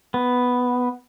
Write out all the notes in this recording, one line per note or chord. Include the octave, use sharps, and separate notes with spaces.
B3